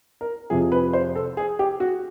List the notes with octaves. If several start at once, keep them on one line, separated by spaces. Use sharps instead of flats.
A#4
F2 C3 F3 G#4
B4
C5
A4
G#4
G4
F#4